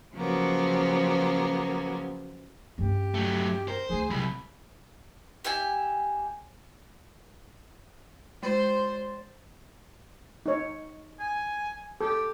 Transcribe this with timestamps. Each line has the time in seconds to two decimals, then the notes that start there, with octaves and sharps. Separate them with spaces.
0.14 C#3 F3 F#3 A#3 B3
2.78 G2 C#4 G4
3.14 F#3 A3
3.68 A#4 C5
3.89 D2 E3 G#4
4.11 C2 F#3 B5
5.44 G4 E5 G#5
8.43 G#3 C5 C6 A6
10.46 D#4 C#5
11.19 G#5
12.01 G4 A4